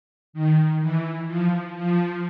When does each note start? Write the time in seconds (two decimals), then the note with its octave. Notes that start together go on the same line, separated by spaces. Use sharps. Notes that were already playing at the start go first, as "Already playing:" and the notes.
0.33 D#3
0.81 E3
1.27 F3
1.75 F3